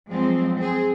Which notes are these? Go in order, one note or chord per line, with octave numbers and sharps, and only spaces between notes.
F3 F#3 G#3 C4
C4 G#4